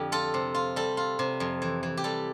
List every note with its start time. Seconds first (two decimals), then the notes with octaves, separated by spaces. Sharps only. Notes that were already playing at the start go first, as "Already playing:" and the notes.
Already playing: F2 D3 G4
0.12 F4 A4
0.34 C3
0.55 F4
0.76 G3 A4
0.97 F4
1.19 C3
1.40 F2
1.62 E3
1.83 E3
1.97 G4
2.04 G3 A4